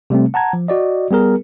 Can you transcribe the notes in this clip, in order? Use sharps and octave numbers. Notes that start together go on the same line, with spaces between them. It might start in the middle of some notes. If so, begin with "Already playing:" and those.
C3 G3 A3 C4
F#5 A5 A#5 G#6
F3
F#4 D5 D#5
G3 B3 G#4 A#4